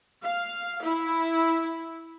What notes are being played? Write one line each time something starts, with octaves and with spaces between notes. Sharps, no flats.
F5
E4